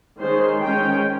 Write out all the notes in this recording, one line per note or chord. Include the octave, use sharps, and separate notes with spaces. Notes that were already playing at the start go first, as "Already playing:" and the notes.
D#3 G#3 C#4 C5
D#3 G#3 C#4 G5